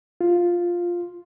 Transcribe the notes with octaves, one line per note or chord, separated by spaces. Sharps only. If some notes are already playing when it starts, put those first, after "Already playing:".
F4